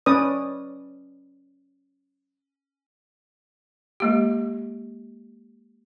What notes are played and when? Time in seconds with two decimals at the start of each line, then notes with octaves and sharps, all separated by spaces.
0.06 C#4 B4 D5 D#6
4.00 G#3 A#3 G4